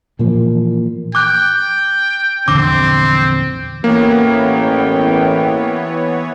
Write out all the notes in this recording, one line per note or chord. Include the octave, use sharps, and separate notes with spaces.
A#2 E3 F3 A#3
G5 D6 F#6
A#1 E2 D3 C4 D6
A1 E3 A#3 B3 C#5 G5